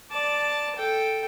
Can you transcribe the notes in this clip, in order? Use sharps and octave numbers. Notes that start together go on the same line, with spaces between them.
D5 A5
A4 G5